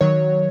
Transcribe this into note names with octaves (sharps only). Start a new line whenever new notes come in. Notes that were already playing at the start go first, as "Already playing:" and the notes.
D#3 F#3 C#5